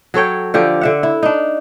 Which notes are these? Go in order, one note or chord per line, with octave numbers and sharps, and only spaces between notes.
F#3 A4 C#5 G5
D3 F3 G4
D3 E5 F#5
E4
D4 D#4